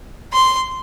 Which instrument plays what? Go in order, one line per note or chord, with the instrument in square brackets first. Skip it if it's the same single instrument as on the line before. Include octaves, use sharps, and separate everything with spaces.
[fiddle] C6